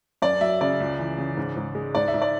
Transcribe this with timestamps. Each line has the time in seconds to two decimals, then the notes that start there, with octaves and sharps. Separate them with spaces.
0.22 F#2 D5
0.41 F#3 E5
0.61 C#3 D5
0.80 C#2
0.99 E3
1.18 C#3
1.37 G#2
1.56 G#2
1.75 G#3
1.95 G#2 D5
2.08 E5
2.14 G#2
2.22 D5